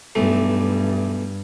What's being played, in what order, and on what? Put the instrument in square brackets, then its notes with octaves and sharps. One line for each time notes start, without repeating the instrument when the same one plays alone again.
[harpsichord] B1 E3 A3 [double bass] G2